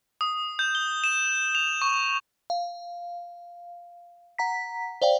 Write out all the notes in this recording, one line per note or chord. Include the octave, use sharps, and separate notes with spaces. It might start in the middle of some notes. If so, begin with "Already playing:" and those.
D#6
G6
G7
E7
F7
C#6
F5
F#5 A#5 B6
C5 D5 F5 G5